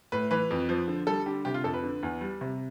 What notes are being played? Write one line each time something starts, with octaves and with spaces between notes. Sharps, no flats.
A2 B4
E3 B4
F2
F3
D3
G3 A4
D3 G4
C3 G4
F4
F2 A4
B4
D3
E2
G3
C3